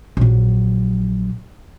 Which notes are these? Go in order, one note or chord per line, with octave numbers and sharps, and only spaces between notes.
A#1 F#3